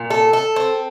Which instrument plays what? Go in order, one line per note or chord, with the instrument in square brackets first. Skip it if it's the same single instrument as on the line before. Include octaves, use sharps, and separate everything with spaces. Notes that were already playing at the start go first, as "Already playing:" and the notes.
Already playing: [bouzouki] A#2
A4
A4
C4